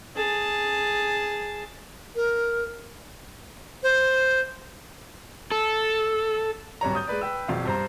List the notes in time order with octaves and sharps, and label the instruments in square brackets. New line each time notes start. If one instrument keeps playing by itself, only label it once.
[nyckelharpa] G#4 A5
[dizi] A#4
C5
[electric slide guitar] A4
[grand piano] D1 G2 C#5 A#5
D#6 G6
G#3 B4 D5
B4 G5 E6
E1 F2 F5
G2 C5 A#5